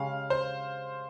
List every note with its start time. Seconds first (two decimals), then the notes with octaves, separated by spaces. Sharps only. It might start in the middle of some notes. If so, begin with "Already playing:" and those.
Already playing: C#3 G#3 C#4 G4 F5
0.30 C5